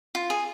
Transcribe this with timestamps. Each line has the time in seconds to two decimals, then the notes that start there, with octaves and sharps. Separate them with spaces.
0.15 F4
0.30 G#4